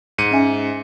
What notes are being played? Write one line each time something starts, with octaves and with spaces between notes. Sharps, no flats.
G#2 C#7 D#7
C#4 E5 G#5